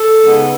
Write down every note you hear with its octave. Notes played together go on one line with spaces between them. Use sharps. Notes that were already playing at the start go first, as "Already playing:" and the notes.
Already playing: A4
C#3 G#3 B3 D#4